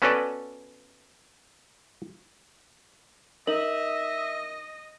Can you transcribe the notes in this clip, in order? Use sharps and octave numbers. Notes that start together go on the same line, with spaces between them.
B3 C#4 F#4 A4 B4 D5
D#4 A#4 D#5 E5 F#7